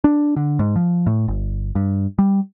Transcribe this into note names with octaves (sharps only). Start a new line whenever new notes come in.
D4
D3
G#2
F3
A2
G1
G2
G3